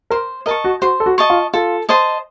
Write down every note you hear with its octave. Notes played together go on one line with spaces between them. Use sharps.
A#4 C5
A#4 D#5 A5 C#6
F#4
F#4 C5
A4
F#4
D#5 A5 C#6
F4
F4 A4
C5 D#5 A5